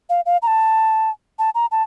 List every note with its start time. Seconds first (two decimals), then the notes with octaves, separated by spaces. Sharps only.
0.10 F5
0.26 F5
0.42 A#5
0.47 A5
1.39 A5
1.55 A#5
1.72 A5